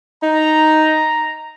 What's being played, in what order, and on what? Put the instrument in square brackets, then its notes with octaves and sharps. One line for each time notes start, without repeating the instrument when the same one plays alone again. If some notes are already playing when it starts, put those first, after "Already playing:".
[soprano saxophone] D#4 [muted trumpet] A#5